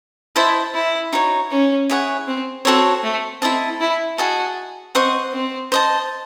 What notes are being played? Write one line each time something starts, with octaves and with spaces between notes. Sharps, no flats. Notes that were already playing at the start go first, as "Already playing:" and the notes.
E4 C5 D#5 A5
E4
D#4 F#4 C#5
C#4
E4 G#4 C#5 F#5
C4
C4 F#4 A4 C#5
A3
C4 E4 A4 D#5 A5
E4
F#4 G#4 D#5 A5
C4 C5 D#5 F#5 C#6
C4
C5 D#5 A5